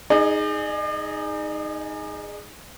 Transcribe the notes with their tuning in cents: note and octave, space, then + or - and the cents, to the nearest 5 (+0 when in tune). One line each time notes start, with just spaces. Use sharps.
D#4 +0 G#4 +0 D5 +45